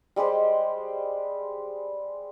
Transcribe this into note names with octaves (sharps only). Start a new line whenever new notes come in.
G3 G#3 G4 C5